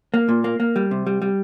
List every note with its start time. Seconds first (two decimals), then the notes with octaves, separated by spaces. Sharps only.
0.14 A#3
0.29 A#2
0.44 A#3
0.60 A#3
0.76 G3
0.91 C3
1.07 G3
1.22 G3